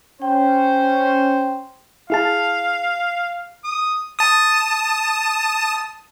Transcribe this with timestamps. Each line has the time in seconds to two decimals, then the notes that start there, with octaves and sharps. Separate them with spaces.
0.22 C#4 C5 G5
2.10 E4 G#4 F5 A5
3.64 D#6
4.19 A5 D#6